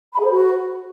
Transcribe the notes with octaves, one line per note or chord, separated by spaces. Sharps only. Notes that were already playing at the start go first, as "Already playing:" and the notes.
B5
G#4
C5
F#4